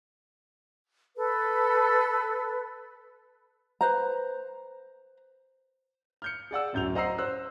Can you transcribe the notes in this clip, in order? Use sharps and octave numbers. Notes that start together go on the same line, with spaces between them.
A4 B4
B4 C5 A#5
F6 G6 C#7
G#4 D5 F#5 E6
D1 F#2 G6 F7
C5 D#5 F#5 A#5 E6 C7
C5 E6 F#6